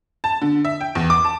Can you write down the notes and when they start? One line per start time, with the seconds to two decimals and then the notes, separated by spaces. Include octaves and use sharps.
0.24 A5
0.41 D3
0.65 E5
0.81 G5
0.95 E2
1.10 D6
1.25 A5